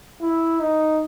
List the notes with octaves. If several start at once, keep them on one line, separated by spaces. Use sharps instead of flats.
E4
D#4